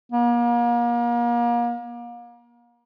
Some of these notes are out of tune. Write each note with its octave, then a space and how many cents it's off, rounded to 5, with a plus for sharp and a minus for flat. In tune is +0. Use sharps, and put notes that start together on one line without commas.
A#3 +35